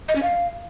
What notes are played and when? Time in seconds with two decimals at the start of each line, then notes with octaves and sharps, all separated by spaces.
0.08 D#5
0.15 C#4
0.23 F5